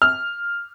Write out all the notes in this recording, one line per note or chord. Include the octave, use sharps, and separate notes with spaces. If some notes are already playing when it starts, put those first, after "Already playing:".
F6